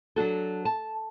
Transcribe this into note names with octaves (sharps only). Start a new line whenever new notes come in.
F#3 D4 F#4 A4
A5